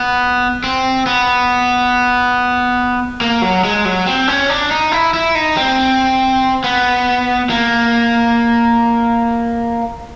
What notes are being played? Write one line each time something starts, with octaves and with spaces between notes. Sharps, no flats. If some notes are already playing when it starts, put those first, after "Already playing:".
Already playing: B3
C4
B3
A#3
F#3
G#3
F#3
C4
C#4
D4
D#4
E4
E4
D#4
C4
B3
A#3